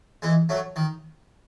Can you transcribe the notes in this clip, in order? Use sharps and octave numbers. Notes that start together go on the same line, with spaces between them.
E3 G#3
F#3 A3
D#3